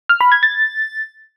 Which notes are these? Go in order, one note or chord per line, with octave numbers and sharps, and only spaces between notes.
F6
B5
G#6
A6